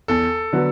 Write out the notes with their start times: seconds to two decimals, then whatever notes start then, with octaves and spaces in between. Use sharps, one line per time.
0.08 E2 A4
0.53 D3 F#3 B3